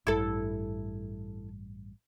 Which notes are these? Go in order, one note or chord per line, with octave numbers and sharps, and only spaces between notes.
A1 G2 E4 A4